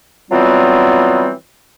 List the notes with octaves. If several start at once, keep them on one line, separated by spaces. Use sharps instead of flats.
E3 F#3 G3 B3 C4 F4